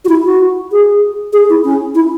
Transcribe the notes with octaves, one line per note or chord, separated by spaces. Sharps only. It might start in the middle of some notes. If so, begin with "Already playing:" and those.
F#4
E4
F#4
G#4
G#4
E4
C#4
E4